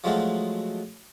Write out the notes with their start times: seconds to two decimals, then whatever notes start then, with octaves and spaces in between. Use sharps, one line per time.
0.04 F3 F#3 G#3 A3 F4 F#4